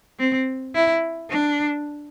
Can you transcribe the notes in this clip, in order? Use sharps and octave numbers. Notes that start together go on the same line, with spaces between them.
C4
E4
D4